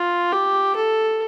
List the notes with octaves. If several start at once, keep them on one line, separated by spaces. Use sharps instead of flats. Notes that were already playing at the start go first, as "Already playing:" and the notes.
Already playing: F4
G4
A4